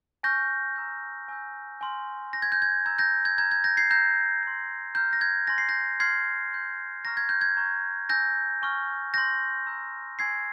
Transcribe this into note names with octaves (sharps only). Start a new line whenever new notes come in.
G#5 C#6 F6 G6 A#6
A#5 E6 G6
G#5 E6 G6
G#5 C6 F6
C6 G6 A#6
G#6
G6
G#6
A#5 E6 G6 G#6
G6 A#6
G#6
A#5 F6 G#6
G#6
G6 A#6
G#6 C7
A#5 E6 G6 A#6
C6 G6
A#5 F6 G6
A#6
G#6
G#5 C6 G6 A#6
C7
G6 A#6
C6 F6 G#6 C7
C6 G6
A#5 C#6 F6 A#6
G#6
G6
G#6
A#5 C#6 F6
G#5 E6 G6 A#6
G#5 C#6 F6
C6 E6 G6 A#6
A#5 E6 G6
G#5 C6 E6 G#6 C7